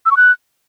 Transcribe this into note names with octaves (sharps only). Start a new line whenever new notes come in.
E6
C#6
F#6